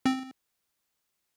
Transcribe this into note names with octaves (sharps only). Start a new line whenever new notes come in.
C4